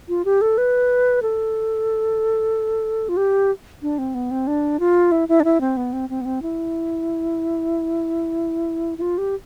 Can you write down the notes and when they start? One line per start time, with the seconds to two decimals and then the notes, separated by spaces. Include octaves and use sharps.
0.09 F4
0.25 G4
0.41 A4
0.58 B4
1.22 A4
3.09 F4
3.17 G4
3.82 D4
3.98 C4
4.14 B3
4.31 C4
4.47 D4
4.80 F4
5.12 E4
5.29 E4
5.40 D4
5.44 E4
5.61 C4
5.77 B3
5.93 C4
6.09 C4
6.21 B3
6.25 C4
6.42 E4
8.98 E4
9.02 F4
9.18 G4